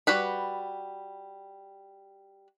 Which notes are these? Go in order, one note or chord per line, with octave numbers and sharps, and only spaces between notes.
G3 F#4 B4 B5